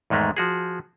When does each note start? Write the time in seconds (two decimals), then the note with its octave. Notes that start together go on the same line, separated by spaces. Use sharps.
0.10 E2 G#2 D#3 G#3 A3
0.36 F3 F#4 G#4